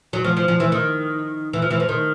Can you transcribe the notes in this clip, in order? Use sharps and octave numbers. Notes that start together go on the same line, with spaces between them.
F#3
F3
F3
F3
E3
D#3
E3
F3
E3
F3
D#3